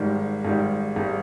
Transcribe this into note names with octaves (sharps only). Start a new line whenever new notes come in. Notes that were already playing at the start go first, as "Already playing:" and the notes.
Already playing: G#1 G#2 D#3 G3
G#1 G#2 D#3 G3
G#1 D#3 G3